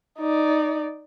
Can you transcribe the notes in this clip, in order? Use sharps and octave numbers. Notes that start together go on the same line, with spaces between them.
D#4 D5